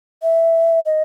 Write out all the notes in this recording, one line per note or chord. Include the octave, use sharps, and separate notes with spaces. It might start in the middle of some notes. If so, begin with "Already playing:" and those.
E5
D#5